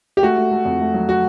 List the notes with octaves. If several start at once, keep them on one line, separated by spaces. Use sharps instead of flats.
G4
A3 F#4
A3
A3
F2
A3
F#3
F#4